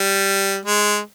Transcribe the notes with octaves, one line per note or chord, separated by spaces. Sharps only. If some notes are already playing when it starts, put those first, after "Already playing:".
Already playing: G3
G#3